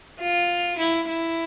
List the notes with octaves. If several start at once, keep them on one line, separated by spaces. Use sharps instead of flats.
F4
E4
E4